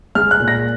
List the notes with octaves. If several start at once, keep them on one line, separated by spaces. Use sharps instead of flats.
G#3 F6
F#6
A#2
A#6